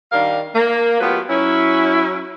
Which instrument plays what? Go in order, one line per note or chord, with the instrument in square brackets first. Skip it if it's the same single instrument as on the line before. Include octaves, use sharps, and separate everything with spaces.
[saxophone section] D#3 G3 D4 A#4 F5
A#3
F#3 A3 B3 F4 G4 B4
F#3 C#4 E4